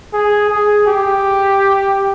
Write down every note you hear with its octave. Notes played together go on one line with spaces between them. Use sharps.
G#4
G#4
G4